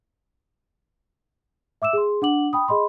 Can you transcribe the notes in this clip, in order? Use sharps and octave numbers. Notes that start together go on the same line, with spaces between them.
E5 D6 E6 E7
G#4 C6
D4 F#5 D6 F#7
G5 B5 D#6
G#4 D#5 B5 C6